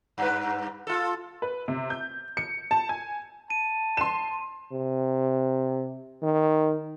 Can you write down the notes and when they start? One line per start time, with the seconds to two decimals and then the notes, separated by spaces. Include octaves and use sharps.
0.18 G2 B4
0.87 F4 A4
1.42 B4
1.68 C3
1.90 G6
2.37 C#7
2.71 A5
2.89 G#5
3.50 A5 D#7
3.97 C6 E7
4.72 C3
6.23 D#3